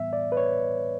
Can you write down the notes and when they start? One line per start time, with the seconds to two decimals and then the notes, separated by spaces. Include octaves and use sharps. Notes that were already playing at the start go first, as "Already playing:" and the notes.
Already playing: A2 E3 G3 B3 E5
0.13 D5
0.32 B4
0.37 C#5